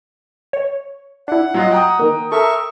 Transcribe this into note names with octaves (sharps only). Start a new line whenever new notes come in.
C#5
D4 E4 F#5
F#3 F4 D#5
G5 A#5 D#6
D#3 A#3
A4 A#4 E5 C#6